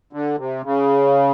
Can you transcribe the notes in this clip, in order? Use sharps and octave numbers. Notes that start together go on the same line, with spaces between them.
D3
C3
C#3